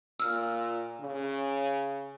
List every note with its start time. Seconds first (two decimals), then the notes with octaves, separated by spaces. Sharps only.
0.20 A#2 E6 F6
1.00 C#3